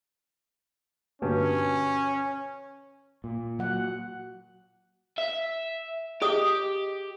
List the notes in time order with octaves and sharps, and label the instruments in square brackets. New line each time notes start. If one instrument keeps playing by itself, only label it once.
[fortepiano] G2 B2 D3 [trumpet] C#4
[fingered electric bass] A#2
[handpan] F#3 F#5
[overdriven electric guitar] E5
[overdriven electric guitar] G4 [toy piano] G#4 D#5 D#6